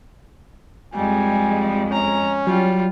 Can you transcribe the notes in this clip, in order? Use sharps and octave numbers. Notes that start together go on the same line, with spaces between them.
F2 G3 G#3 G#5
C#4 A#5
F#3 G3 F4